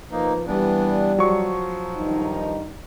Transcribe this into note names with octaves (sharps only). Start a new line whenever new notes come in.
F3 A#3 D#4 B4
E3 G3 B3 D4
F3 F#3 C#6
G2 D#3 D#4